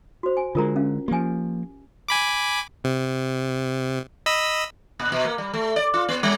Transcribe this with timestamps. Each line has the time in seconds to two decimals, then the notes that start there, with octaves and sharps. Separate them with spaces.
0.23 F#4 C5
0.37 G#5
0.55 D3 G#3 F4 A#4 A#5
0.76 C#4 F5
1.08 F3 A#3 G4 G#5
2.08 G#5 B5 D6
2.84 C3
4.26 D#5 B5 E6
5.00 A#2
5.12 B2
5.25 A#3
5.38 G3
5.54 A3
5.76 D5
5.94 F4
6.09 B3
6.23 G3